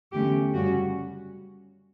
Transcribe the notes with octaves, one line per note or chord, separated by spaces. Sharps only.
E2 D3 F#3 A3 C#4 G4
F#2 C#3 G3 C#4 F#4